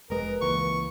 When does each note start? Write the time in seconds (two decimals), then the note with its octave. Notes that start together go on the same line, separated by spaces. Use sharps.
0.10 F1 G#3 A#4 B4
0.41 C#2 E3 A#3 C#6